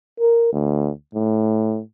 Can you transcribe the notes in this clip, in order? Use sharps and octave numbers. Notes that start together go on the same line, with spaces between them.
A#4
D2
A2